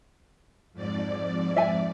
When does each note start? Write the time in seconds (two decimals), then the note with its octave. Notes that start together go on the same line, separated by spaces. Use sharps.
0.73 F2 G#2 D5
1.56 E5 G#5